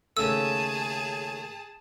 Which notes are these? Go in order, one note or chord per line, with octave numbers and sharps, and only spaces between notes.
D#2 C#3 A3 G#4 A5 E6